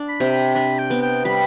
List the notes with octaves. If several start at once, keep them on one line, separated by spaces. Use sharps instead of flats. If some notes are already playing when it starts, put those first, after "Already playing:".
Already playing: D4
B5
C3
B5
D4 B5
G5
B3
G5
G3 B5